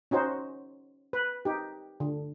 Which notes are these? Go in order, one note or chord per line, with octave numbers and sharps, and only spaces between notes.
C#4 D#4 F#4 C5
B4
D#4 G4
D3